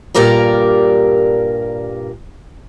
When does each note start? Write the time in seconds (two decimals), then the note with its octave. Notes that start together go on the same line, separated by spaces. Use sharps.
0.14 G2 A#2 G4 A#4 D5 A#5